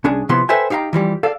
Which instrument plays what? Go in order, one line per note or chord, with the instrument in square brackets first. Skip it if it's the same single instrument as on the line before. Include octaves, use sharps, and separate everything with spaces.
[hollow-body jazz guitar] C2 C#4 D4 G#4
C3 F3 B3 E4 C6
A4 B4 C5 E5 G5 G#5
D#4 G4 F5 G5 A#5
E3 F3 G3 G4
A4 D5 F5